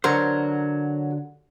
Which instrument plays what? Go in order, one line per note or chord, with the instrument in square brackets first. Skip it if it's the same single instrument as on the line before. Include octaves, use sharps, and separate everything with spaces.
[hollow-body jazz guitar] D3 A#4 C5 [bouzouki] F#3